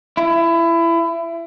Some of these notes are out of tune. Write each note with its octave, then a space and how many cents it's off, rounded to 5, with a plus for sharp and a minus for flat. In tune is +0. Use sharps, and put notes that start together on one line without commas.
E4 +25